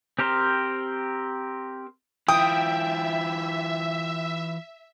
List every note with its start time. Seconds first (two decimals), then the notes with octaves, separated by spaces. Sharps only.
0.19 C4 G4 A#4 C5
2.28 E3 F4 E5 G5 D#6